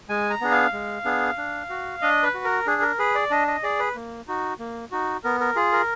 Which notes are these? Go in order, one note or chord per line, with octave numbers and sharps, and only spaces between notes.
G#3 G#5
A#5
B3 D4 G#4
F5
G#3
B3 D4 G#4
D4
F#4
D4 D#5
B4
F#4
A#4
D4 G#4
A#4
G#4 B4
D5
D4 D#5
D#5
G#4 D5
B4
A#3
D#4 F#4
A#3
D#4 F#4
B3 A#4
A#4
F4 G#4
A#4